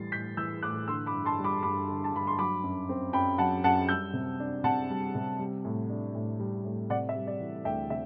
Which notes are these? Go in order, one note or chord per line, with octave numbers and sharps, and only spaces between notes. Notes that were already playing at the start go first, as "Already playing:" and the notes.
Already playing: A2 E3 G3 A6 C7
A2 G6 B6
E3 E6 G6
A2 D6 F#6
D3 C6 E6
B5 D6
G2
A5 C6
G3
B5 D6
G2 B5 D6
D3
A5
G2 B5
C6
F#3 B5 D6
F#2
C4
F#2 G5 B5
F#3 F#5 A5
F#2 F#5 A5
G3 E6 G6
C3
D4
C3 F#5 A5
G3
C3
G3
A2
D4
A2
G3
A2
C3 D5 F#5
E5
G3
D5
E3
D2 E5 G5
C3 E5